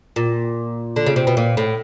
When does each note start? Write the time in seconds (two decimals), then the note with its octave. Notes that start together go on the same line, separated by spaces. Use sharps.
0.16 A#2
0.96 D3
1.06 C#3
1.16 C3
1.27 B2
1.37 A#2
1.57 A2